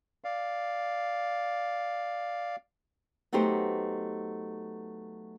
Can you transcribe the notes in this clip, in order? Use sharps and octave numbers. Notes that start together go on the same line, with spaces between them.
D5 F5
F#3 A3 B3 D#4 G4 C5